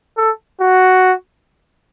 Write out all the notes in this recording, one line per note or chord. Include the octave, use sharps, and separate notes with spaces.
A4
F#4